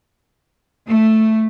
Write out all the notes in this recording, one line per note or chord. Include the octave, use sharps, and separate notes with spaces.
A3